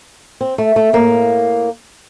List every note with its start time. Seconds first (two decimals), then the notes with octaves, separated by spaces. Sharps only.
0.41 C4
0.58 A3
0.76 A3
0.93 A2 A#3